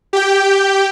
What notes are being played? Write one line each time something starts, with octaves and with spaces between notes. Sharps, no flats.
G4 G5